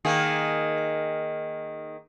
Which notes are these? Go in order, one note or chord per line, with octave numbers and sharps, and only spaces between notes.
D#3 A#3 G#4